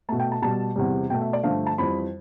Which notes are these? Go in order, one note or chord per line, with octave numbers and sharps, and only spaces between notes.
B2 A3 A5
G5
A5
B2 G3 A5
E2 C3 G3
B2 A3 G5
E5
D5
G2 D3 F3 A3 F5
A5
F2 E3 G3 B5